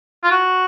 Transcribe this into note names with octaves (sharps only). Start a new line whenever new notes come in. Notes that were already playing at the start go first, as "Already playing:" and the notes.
F4
F#4